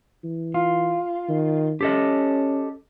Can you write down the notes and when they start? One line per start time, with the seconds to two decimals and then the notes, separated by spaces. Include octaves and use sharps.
0.24 E3
0.54 F4
1.29 D#3
1.81 C#4 G4 A4 D#5